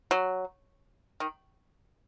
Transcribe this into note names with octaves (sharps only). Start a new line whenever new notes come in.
F#3
D#3